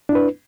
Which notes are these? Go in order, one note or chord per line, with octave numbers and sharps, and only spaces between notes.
D4 E4 B4